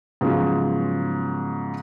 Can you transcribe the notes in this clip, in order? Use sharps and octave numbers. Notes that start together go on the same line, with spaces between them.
G#2 C#3 F3 F#3 B3